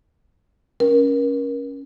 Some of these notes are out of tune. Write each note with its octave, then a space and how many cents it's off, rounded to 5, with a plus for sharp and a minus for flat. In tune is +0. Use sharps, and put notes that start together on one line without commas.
C#4 +0 A#4 +30